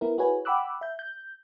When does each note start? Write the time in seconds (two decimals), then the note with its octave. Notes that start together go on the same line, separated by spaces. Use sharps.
0.01 B3 E4 A#4
0.18 E4 F#4 G#4 B4 C#5 G#5
0.45 F#5 G5 B5 D6 E6 F#6
0.81 E5 G6
0.99 G6